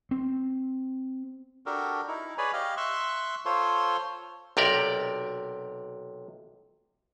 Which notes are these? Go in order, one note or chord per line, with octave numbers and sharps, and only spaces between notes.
C4
D4 F#4 G4 A4 A#4
D#4 E4
G#4 B4 C#5 D5 G#5 B5
G4 D#5 F5
E5 C6 C#6 E6 F#6
F4 A4 C5 C#5 C6
B1 C3 G4 A#4 D5